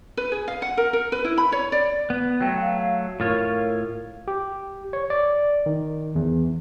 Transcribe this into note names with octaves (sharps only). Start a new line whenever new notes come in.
B4
G#4
F5
F#5
A#4
A#4
B4
E4
B5
C#5
D5
B3
F#3 A3 G5
F5
A2 F4 A#4 C#5
G4
C#5
D5
D#3
E2